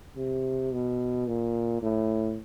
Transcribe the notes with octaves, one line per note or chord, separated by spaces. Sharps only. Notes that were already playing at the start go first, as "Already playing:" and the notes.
C3
B2
A#2
A2